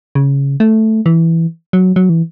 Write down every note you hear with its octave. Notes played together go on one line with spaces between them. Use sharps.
C#3
A3
E3
F#3
F#3
E3